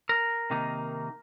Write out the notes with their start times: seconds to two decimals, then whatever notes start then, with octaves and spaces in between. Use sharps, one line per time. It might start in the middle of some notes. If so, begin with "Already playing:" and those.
0.09 A#4
0.50 C3 D#3 A#3 D#4